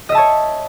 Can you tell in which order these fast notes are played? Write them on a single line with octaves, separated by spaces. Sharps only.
D#5 E5 A5 C#5